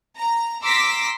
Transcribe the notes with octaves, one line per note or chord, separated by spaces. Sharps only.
A#5
A#5 C6 D6 E6 A#6 B6